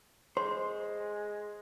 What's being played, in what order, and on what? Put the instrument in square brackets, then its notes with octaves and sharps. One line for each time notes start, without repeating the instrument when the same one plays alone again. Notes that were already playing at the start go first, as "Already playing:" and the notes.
[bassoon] G#3 [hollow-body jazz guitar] C5 [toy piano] C6